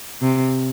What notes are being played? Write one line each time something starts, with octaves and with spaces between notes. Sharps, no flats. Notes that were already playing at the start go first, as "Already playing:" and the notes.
C3